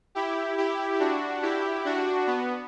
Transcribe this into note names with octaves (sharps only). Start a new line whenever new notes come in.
E4 G4
E4 G4
D4 F#4
E4 G4
D4 F#4
B3